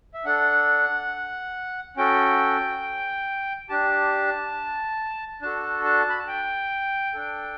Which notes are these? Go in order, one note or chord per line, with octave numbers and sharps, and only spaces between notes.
E5
D4 A4 F#5
C#4 F#4 A4 G5
D4 G4 A5
D4 F#4 A4 A5
A5
B5
A5
G5
D4 A4